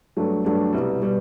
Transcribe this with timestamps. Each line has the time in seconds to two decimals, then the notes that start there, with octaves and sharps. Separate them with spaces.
0.17 G2 F#3 A3 D4
0.45 G2 F#3 A3 D4
0.73 C2 B2 G3
1.02 B2 G3